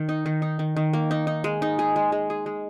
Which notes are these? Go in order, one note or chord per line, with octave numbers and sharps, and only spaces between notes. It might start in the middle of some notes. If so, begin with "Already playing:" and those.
Already playing: D#3
D#4
D#3
D#4
D#3
D#3
A#3
D#4
D#4
G#3
D#4
G#4
G#3
G#3
G#4
G#3